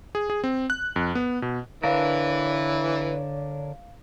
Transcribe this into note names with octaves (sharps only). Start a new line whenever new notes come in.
G#4
G#4
C4
F#6
F2
B3
B2
D3 E3 D4 A#4 B4 C#5 F5